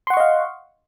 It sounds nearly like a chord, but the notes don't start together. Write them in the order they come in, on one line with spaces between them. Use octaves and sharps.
C6 F#5 C#6 D#5 F5